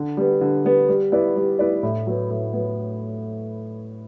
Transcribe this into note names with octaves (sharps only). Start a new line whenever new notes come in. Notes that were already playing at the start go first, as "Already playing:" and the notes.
Already playing: D3
G3 B3
D3
G3 B3
G3
B3 E4 B4 D5
G3
B3 E4 B4 D5
A2
F#3 B3
A2
F#3 B3